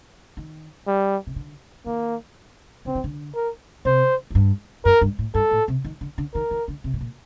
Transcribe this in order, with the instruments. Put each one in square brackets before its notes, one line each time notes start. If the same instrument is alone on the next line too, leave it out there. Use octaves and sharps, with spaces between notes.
[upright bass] D#3
[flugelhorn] G3
[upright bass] C3
D3
[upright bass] D#3 [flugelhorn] A#3
[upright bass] D3 [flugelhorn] C4
[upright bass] D#3
D3
[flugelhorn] A#4
[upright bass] C3 [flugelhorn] C5
[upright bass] A2
G2
[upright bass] F#2 [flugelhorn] A#4
[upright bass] G2
A2
[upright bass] G2 [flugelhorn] A4
[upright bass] A2
C3
D#3
D3
D3
[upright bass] D#3 [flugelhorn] A#4
[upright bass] D#3
D3
C3
A2
A#2